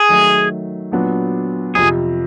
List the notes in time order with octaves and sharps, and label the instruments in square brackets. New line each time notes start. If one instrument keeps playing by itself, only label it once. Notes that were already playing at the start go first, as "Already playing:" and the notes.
Already playing: [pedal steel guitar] G#4
[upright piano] D#3 F#3 A3
A#2 F#3 B3 D4 F#4
[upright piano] F2 C3 F3 [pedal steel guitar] G#4